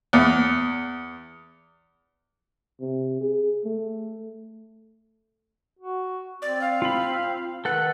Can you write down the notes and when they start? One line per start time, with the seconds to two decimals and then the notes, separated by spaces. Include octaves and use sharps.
0.13 E2
2.81 C3
3.21 G#4
3.65 A3
5.79 F#4
6.42 C4 D5
6.61 F5
6.82 F4 B5
7.65 D#3 A4 B4 F#5